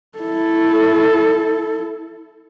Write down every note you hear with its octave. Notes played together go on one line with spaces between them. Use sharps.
E4 A4